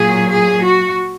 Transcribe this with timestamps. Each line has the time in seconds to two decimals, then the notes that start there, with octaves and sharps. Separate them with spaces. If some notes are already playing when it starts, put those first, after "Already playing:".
Already playing: A#2 F#3 G#4
0.31 G#4
0.63 F#4